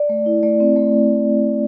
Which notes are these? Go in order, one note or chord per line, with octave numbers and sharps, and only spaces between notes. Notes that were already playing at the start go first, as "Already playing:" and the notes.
Already playing: D5
A3
E4
A3 D5
C4
A3